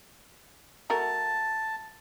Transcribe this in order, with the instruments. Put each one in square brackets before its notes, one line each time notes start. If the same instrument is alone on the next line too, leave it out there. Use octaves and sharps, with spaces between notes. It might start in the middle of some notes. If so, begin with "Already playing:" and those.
[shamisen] A3 F#4 A#4 [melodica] A5